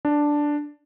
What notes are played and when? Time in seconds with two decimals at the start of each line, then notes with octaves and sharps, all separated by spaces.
0.05 D4